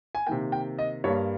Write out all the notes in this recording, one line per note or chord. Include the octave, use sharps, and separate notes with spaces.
G#5
C3 D#3 A#3 G5
G5
D#5
G2 G3 A#3 C#5